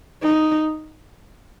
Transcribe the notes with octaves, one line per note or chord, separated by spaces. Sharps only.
D#4